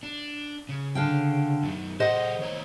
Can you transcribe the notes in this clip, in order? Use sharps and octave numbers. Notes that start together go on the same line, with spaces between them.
D4
C#3
D3 F5 G5
F#2 D#3
G#4 A4 C5 D#5 F#5
D#3 C#5 A#5